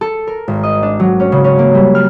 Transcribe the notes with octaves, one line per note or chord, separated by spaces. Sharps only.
A4
A#4
G#1
D#5
D4
F#3
C#4
C#3
C#4
A#3
G3
F6